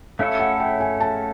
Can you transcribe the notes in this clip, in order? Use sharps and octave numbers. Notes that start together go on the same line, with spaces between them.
A3 C#4 E4 A4 C#5 F5
F#5
G5
G#5
A5